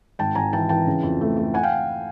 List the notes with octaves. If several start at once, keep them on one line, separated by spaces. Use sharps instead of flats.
G#1 G5 A5
G#1 G#5 A#5
E3 G5 A5
E3 G5 A5
C#3
F2
A3
A3
F#5 G#5
F5 G5